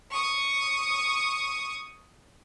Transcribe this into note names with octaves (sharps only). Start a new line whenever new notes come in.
C#6 D#6